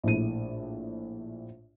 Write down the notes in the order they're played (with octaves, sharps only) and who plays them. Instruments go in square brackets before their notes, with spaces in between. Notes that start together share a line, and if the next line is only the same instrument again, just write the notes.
[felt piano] A#1 A2 D#7